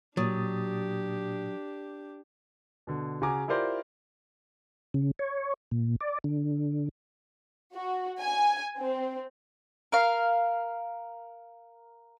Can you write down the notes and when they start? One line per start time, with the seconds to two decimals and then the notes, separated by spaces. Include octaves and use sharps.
0.17 A#2 F#3 D4 G4 D#6 A6
2.87 B2 D3
3.22 C#3 F#4 G#5 A#5 D6
3.48 E4 F4 G4 A#4 C5 D5
4.94 C#3
5.19 C#5
5.71 A#2
6.01 D5
6.24 D3
7.74 F#4
8.21 G#5
8.79 C4
9.92 A#4 F5